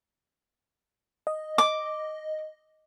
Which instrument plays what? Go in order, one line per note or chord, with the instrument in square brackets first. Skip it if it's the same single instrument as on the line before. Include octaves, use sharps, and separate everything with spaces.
[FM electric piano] D#5
[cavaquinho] D6